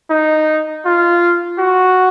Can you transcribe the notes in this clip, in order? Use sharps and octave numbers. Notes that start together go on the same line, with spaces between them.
D#4
F4
F#4